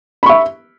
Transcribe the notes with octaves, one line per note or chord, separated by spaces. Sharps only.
E5 B5 C#6